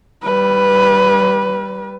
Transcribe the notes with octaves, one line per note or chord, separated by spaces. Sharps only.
G3 B4